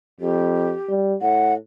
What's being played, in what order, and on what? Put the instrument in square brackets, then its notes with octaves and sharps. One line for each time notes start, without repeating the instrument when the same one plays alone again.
[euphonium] F2 [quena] G4
[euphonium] G3
[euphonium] A2 [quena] F#5